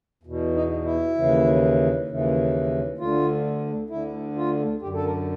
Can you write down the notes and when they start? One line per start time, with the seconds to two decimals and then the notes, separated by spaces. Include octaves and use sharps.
0.23 E2 B2
0.54 D#4
0.84 E4
1.15 D#2 C#3 E3
2.07 D#2 C#3 E3
2.98 D2 D3 F4
3.90 D2 D3 E4
4.36 F4
4.82 F#2 D3 G4
4.94 A4
5.05 A#4